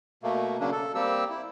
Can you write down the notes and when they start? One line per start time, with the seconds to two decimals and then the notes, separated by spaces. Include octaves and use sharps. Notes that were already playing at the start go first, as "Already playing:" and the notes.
0.23 B2 A3 A#3
0.60 C#3 F#3 A#3 C#4 D4
0.72 A4
0.95 G3 A#3 C4 G4 E6
1.29 E4